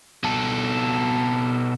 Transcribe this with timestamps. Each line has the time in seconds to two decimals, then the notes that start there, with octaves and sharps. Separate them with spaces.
0.24 B2 A4